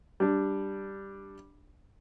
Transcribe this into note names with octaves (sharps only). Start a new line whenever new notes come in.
G3 D4